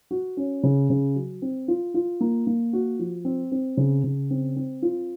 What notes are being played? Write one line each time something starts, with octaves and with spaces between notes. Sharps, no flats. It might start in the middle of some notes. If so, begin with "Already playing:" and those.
F#4
C#4
C#3
C#3
F#3
C4
F4
F4
A#3
A#3
F#4
F3
C4
C4
C#3
C#3
C4
C4
F4